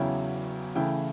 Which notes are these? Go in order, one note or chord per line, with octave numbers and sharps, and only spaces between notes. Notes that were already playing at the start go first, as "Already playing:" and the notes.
Already playing: E2 C#3 F#3 C#4 E4 G5
C#3 E3 A3 E4 G5